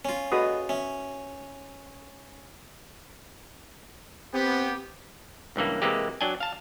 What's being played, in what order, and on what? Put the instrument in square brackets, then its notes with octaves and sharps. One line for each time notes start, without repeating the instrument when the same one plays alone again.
[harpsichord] C#4 F4
[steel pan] F#4 B4 D#6 [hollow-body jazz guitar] G#4 A4 D#5
[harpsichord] C#4 [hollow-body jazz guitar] E5
[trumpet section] B3 G4 [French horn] C4
[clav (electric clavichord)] C#2 G2 E3 A#3
C3 E3 G#3 A#3 G4
F#3 D4 G5 G#5
F5 A5